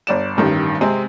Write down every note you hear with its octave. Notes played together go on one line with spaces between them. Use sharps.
G1 D5 E7
A1 G2 D#3
C3 G#3 C4